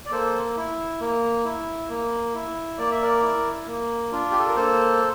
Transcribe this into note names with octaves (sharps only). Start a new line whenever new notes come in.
D5
A#3 A4 C5
E4
A#3
E4
A#3
E4
A#3 D5
E5
A#4 D5
E4
A#3
D4 F4
G4
A4
A#4
A#3 A4 C5